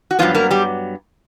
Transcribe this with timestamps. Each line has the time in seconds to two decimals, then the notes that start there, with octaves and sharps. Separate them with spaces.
0.11 F#4
0.19 G2 D#3 F3 F#3 B3 F4
0.35 A#3 A#4
0.51 G3 G4